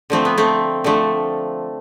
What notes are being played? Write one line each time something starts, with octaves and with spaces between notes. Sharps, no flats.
D3 F3 A3 C4
B3
A3 C4
D3 F3 A3